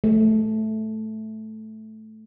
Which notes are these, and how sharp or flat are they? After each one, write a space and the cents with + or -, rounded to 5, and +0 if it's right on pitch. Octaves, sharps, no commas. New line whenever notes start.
A3 -10